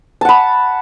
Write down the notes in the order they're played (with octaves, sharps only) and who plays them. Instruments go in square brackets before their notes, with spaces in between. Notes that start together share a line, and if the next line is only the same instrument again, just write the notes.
[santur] A5
F#5
B5